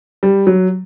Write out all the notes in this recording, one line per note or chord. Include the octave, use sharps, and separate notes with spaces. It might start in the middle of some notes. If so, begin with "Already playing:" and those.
G3
F#3